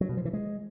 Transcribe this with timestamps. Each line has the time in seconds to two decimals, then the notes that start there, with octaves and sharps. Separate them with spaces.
0.01 F#3
0.09 B2
0.17 F3
0.25 E3
0.33 G#3